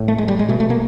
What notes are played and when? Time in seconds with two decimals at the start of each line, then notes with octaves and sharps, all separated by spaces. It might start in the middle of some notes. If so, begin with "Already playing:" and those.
Already playing: A2
0.08 A3
0.18 G#3
0.28 G3
0.39 G#3
0.49 B2 A3
0.60 A3
0.70 A#3